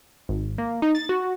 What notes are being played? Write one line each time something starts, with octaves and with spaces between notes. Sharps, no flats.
G#1
A#3
D#4
A6
F#4